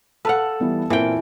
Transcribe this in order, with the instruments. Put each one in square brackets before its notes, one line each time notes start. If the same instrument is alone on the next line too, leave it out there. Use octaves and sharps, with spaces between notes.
[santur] A4 [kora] B4 F5 F#5
[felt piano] E3 G3 B3
[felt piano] A#2 C4 A#4 [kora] E3 G5